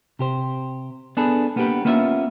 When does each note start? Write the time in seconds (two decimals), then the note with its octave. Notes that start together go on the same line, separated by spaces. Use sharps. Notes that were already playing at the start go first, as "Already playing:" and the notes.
0.19 C3 G4 C5
1.17 B3 D4 G#4 A4 B4
1.56 A#3 B3 D4 F4 G4 B4
1.85 A#3 B3 C#4 E4 F4 E5